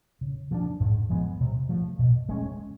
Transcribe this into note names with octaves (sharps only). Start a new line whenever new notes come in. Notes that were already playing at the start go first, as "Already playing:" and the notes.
C#3
F3 A3 D4
G#2
F3 G#3 B3
C3
F3 A3
B2
G#3 C#4